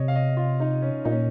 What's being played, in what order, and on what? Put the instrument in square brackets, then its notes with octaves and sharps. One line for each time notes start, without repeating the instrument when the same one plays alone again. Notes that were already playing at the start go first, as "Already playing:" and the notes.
Already playing: [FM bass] C3 [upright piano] C#5 D#5
[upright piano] F5
D#5
F4
D#4
C#4
[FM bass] A#2 [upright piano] D#4
[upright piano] C#4